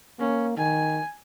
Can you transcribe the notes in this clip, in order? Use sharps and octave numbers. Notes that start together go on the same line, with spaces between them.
A#3 C#4
D#3 G#5